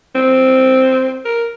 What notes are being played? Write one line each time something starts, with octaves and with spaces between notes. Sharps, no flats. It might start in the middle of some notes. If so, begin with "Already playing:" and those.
C4
A#4